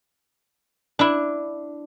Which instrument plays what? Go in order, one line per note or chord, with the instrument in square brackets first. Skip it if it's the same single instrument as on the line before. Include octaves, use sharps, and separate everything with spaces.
[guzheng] D4 E4